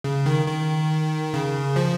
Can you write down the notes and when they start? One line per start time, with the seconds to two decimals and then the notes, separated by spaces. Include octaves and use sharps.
0.04 C#3
0.26 D#3
0.47 D#3
1.34 C#3
1.76 F3